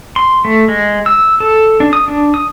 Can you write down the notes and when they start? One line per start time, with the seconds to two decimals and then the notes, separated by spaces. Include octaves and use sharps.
0.16 C6
0.45 A3
0.68 G#3
1.06 E6
1.40 A4
1.80 D4
1.93 D#6
2.08 D4
2.34 D#6